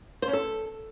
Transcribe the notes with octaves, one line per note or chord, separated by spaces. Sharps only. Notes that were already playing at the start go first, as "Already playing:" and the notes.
C5
C#4
A4